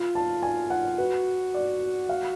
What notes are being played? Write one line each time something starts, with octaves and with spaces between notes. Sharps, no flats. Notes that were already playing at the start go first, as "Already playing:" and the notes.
Already playing: F4
A5
G#5
F#5
F#4 B4
D5
F5